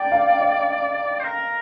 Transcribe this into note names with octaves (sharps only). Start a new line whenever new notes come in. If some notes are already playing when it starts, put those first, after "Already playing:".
Already playing: D5 G5
F5
D#5
C5
A#4